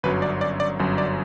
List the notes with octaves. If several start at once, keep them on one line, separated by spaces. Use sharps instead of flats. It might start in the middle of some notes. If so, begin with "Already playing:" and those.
G1 F#2 F#3 B4
D5
D5
D5
G1 F#2 F#3
D5